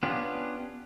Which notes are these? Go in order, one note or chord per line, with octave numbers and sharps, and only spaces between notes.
B3 C#4 D4 F4 G4